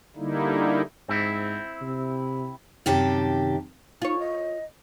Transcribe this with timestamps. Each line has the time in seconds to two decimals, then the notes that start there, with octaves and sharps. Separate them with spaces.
0.16 D3 G3 A#3 D#4 E4
1.08 G#2 C4 E4
1.81 C3
2.86 F#2 C3 D#3 G4 A5
4.02 D#4 F4 C#5
4.19 D#5